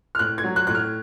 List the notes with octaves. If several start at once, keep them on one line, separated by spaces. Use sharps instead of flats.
F6
A2 F#6
G#6
F#3
F#6
A2 F#6
F6